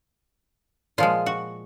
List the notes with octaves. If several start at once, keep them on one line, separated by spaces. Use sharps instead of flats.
A#2 F3 G#3 F4
F#4